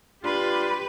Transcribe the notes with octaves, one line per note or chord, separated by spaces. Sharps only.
D4 F4 G4 B4 C6